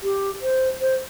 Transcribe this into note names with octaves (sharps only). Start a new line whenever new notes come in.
G4
C5
C5